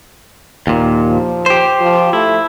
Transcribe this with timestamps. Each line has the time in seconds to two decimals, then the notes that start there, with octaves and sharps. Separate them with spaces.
0.67 D#2 A#2
1.08 F3
1.46 G4 C5
1.81 F3
2.13 A3 E4